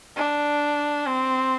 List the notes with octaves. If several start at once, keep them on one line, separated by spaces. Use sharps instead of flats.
D4
C4